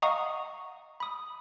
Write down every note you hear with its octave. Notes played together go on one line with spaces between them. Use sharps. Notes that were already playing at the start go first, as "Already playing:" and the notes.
D#5 F5 F#5 A#5 C#6 D#6
B5 D#6